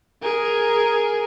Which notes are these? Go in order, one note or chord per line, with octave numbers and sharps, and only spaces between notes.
G#4 A#4